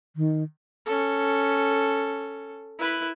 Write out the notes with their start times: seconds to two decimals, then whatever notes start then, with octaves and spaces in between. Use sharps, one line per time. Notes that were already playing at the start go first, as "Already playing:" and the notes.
0.16 D#3
0.86 C#4 A4
2.79 E4 B4